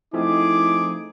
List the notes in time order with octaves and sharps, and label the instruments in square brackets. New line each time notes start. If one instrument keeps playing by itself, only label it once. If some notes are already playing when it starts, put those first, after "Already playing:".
[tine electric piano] F3 A3 C4 [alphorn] D#4 [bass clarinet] E4 [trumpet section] G#4 D6